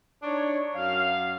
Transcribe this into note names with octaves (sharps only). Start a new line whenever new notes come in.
D4 D#4 C#5
F#2 F5